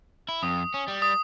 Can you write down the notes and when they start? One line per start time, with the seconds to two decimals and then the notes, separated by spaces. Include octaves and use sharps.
0.29 E4
0.43 F2 D#6
0.74 C#4
0.88 G3
1.02 D#6